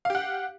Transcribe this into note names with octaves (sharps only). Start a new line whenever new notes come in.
G4 F5 F#5